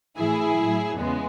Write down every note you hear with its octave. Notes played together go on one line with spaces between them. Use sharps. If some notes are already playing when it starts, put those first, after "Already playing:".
A2 E3 E4 G#4
A2 F#3
E2 C#3 G#3 B3